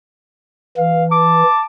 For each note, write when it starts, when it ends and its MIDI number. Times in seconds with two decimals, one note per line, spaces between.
0.77 1.43 52
0.77 1.04 77
1.11 1.65 81
1.11 1.62 86